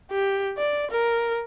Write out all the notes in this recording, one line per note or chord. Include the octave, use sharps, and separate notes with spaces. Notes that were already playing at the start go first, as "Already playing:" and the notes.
G4
D5
A#4